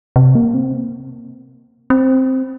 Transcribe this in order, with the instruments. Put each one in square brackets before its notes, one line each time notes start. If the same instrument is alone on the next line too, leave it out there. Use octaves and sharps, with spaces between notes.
[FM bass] C3
A#3
C4
C4